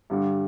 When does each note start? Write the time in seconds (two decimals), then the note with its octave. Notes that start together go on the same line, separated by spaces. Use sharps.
0.10 G2 D3 G3